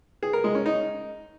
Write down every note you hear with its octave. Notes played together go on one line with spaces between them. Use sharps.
G#4
A#4
G#3
C#4
D#4